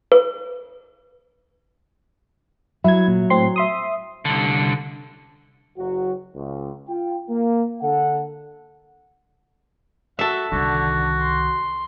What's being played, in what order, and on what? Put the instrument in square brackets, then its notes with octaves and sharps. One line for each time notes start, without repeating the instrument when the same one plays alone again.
[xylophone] B4
[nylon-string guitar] F#3 [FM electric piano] E4 G#6
[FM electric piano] A#2
A2 C4 C6
E5 C6 D#6
[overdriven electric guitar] C2 D3
[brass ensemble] F#1 F#3 F#4
C#2
F4 G5
A#3
D3 A4 F#5
[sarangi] F#4 [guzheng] A4 E5
[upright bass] C2 D#3 [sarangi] D3 [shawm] F#4
[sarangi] C6